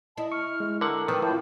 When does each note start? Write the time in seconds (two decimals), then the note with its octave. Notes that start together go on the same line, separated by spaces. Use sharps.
0.18 E4 D#5 A5 D#6
0.32 C#6 F6
0.60 G#3
0.81 D3 A#4 F#5 E6
1.08 D#3 F3 C4 B4 G5
1.22 A2 E4 F4 A5 G6